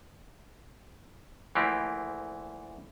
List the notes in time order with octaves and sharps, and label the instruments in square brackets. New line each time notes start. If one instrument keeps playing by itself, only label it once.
[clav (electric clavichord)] D2 E3 F3 A3 A#3 G4